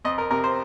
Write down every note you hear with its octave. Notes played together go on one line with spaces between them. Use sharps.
F2 D#5
A#4
C3 A#4
C5